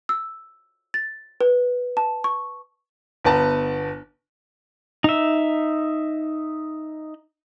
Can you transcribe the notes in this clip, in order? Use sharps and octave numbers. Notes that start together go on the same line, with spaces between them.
E6
A6
B4
A5
C#6
G1 B3 B4 A5 A#5
D#4 E5